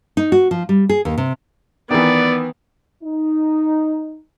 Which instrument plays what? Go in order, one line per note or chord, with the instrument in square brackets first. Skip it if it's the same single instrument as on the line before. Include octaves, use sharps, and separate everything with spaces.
[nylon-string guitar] D#4
F#4
F3
G3
G#4
D#2
C3
[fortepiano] D#3 E3 [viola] B3 [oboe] D5
[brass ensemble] D#4